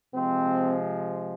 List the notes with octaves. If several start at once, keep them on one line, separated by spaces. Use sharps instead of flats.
C3 F3 G#3 C4